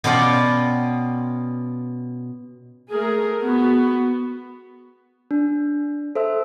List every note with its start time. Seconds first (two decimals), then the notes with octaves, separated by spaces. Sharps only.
0.04 B2 B3 C#4 F4 D5 G5
2.91 A3 G#4 A#4
3.44 B3 F#4
5.31 D4
6.15 A4 C5 E5 E6